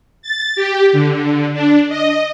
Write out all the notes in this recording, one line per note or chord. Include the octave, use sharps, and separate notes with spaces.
A6
G4
D3
D4
D#5